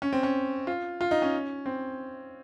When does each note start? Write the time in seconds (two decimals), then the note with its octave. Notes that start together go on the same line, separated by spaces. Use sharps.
0.02 C#4
0.13 C4
0.23 C#4
0.67 F4
1.01 F4
1.11 D#4
1.22 C#4
1.66 C4